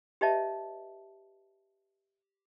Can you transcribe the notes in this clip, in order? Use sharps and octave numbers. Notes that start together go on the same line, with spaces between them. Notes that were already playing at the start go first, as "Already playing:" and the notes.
G4 B4 C#5 D#5 E5 A5